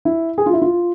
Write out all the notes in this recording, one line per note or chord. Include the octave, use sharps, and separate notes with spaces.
E4
G#4
F4
E4
F4